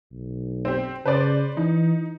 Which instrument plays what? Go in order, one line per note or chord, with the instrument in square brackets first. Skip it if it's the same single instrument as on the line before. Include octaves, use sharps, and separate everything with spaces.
[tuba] B1
[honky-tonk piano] C4 G4
[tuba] C#3 [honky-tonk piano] B4 C5 D5
[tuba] E3 [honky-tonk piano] D#4